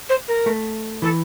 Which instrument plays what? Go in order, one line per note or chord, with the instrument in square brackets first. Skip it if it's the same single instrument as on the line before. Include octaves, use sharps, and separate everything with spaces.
[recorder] C5
A#4
[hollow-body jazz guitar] A3
[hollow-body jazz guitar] E3 [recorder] A4